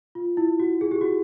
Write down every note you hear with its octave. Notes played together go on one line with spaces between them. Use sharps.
F4
E4
F#4
G#4
G4
F#4